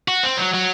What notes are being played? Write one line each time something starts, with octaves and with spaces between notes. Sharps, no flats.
F#4
C4
F#3
F#3